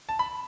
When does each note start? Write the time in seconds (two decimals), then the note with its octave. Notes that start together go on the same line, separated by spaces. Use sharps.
0.09 A5
0.19 B5